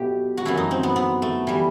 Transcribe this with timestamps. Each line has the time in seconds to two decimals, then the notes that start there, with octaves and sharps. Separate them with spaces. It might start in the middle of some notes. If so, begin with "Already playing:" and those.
Already playing: B2 F#3 A3 G4
0.37 F#4
0.45 F#2 E3 A3 E4
0.57 D#4
0.71 C4
0.83 B3
0.96 B3
1.22 A3
1.47 E3 G3